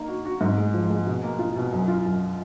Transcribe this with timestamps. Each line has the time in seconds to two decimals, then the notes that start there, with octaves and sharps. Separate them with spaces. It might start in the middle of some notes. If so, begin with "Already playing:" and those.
Already playing: A#3 D#4
0.08 F#4
0.25 F#4
0.41 G#2
0.58 G#3
0.74 F3
0.90 G#3
1.07 B2
1.23 A#3
1.39 F4
1.56 B2
1.72 F#2
1.88 F4
2.05 F#2